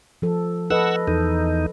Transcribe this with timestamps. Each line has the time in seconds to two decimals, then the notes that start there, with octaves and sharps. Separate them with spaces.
0.22 F3 A4
0.70 A4 B4 D#5 F#5 E6
1.08 E2 D#4 A4